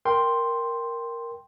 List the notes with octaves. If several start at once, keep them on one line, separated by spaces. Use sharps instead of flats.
A#4 G5 C6